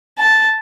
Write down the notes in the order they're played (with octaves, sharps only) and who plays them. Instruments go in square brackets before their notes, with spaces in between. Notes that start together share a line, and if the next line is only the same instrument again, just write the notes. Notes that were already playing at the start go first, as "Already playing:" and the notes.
[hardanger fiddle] A5